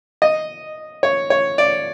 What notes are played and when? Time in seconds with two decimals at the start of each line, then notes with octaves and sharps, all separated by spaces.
0.22 D#5
1.03 C#5
1.30 C#5
1.58 D5